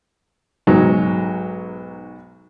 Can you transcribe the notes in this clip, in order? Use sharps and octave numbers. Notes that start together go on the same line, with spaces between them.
B1 G#2 F#3 G#3 D#4